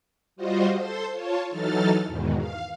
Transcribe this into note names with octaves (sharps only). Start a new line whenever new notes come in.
G3 F4 F#4 C5 D#5
A4 C5 C6
F4 C#5 A5
E3 F#3 D#4 A4 F6 A6
E2 G#2 B2 D#3
F5